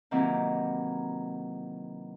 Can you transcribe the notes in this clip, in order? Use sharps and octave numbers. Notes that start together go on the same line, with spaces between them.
C3 D#3 E3 F#3 A#3 C4